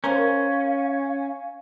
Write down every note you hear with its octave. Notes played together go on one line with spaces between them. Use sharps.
C#4 A#4 C5 F5